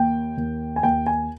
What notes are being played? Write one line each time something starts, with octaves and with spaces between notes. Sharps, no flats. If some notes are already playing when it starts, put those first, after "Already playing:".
Already playing: D#2 A#3 G5
D#2
G#5
D#2 G5
G#5